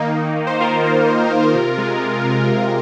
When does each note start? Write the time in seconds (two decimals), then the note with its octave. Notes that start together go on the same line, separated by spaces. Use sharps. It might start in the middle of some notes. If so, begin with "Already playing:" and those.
Already playing: D#3 A#3 D#4
0.13 A#3
0.36 D#3
0.47 C5
0.60 D#3 F4 A#4
0.83 A#3
1.07 A#3
1.30 D#3
1.55 C3
1.78 G#3
2.00 G#3
2.25 C3
2.48 C3